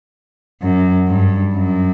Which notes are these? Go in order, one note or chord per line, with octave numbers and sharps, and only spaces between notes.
F#2
G2
F#2